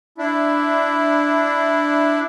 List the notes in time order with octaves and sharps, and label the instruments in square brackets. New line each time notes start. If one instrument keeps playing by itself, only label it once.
[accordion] D4 E4